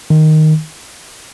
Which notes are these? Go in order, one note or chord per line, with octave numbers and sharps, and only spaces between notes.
D#3